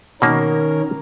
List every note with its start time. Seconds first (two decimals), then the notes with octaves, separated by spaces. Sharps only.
0.22 B2 D#3 A#3 C#4 A#4